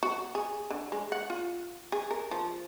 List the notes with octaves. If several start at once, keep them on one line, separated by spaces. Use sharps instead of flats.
F#4
G#4
D3
G#3
F#5
F4
G#4
A#4
F3